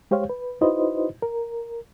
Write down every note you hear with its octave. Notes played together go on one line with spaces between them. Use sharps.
G#3 G4 C5 C#5 F5
B4
D#4 E4 F#4 B4 C5 D#5
A#4